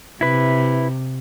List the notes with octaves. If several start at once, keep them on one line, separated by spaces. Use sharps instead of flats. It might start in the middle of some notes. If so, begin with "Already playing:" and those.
C3 E4 B4